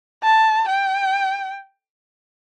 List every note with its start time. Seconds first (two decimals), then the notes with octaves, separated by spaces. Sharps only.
0.23 A5
0.68 G5